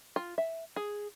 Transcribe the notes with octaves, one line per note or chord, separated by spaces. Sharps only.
F4
E5
G#4